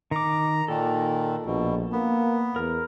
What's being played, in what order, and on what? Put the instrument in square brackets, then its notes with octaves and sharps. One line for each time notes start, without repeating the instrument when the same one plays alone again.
[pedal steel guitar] D#3 D6 [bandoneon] A#5
[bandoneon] A#2 D#3 [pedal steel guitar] A4
[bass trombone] A#1 [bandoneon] B2
[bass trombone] A#3 [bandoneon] B3
[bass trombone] E2 [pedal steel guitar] A#4